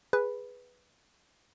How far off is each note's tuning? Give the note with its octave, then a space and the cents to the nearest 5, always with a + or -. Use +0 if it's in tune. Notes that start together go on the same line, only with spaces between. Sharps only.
G#4 +0 B4 +0